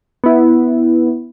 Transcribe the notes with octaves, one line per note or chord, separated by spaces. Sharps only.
B3 E4